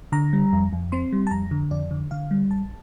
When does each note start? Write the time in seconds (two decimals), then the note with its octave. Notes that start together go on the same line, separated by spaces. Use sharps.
0.12 D3 A#5
0.33 G3
0.53 F2
0.73 F2
0.92 C4 C6
1.12 G3
1.27 A5
1.31 F2 A#5
1.51 D3
1.71 F2 D5
1.91 D3
2.11 D3 F5
2.31 G3
2.51 A1 A5